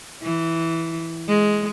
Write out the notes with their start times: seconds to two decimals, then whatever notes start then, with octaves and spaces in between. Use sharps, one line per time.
0.23 E3
1.29 G#3